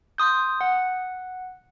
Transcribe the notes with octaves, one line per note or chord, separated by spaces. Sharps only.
C6 D#6 G6
F#5